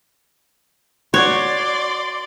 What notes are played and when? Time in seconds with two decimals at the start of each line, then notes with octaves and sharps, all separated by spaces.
1.14 F#4 C#5 D5 C6